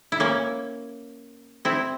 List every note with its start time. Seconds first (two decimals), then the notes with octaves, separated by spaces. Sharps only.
0.12 E4
0.20 A#3 C#4
1.65 C4 E4